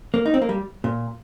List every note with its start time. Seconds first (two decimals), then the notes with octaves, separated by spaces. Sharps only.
0.14 A#3
0.25 D#4
0.34 C4
0.42 A#3
0.49 G3
0.84 A#2